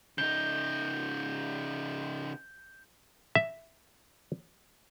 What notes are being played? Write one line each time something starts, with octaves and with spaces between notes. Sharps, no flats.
C#3 D#4 G6 G7
E5